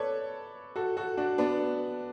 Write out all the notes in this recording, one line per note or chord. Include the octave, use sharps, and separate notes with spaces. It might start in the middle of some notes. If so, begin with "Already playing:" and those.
Already playing: A4 B4 C#5 D5
F#4 A4
F#4 A4
D4 F#4
B3 D4